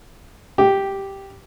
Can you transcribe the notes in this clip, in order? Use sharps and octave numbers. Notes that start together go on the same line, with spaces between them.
G4